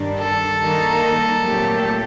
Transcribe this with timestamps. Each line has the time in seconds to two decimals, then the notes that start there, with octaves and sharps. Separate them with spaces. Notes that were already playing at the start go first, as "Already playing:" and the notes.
Already playing: G2 D#3 G3 D4
0.19 A4
0.60 D#3 G3 A#3 D#4
1.41 A#2 F#3 A3 C4 G4